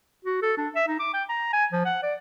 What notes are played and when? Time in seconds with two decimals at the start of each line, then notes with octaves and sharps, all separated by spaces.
0.25 F#4
0.42 A4
0.57 D4
0.75 E5
0.88 D#4
1.00 D6
1.13 G5
1.29 A#5
1.53 G#5
1.72 F3
1.85 F#5
2.03 D5